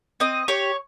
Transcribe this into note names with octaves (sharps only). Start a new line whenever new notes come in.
C4 D#5
G4 C#5